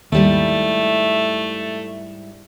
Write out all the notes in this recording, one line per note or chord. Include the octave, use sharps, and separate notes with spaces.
D#2 G#2 G3 A3 E4